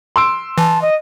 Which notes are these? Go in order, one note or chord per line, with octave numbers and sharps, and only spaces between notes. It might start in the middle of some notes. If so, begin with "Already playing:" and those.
C6 E6 D7
E3 A5
D#5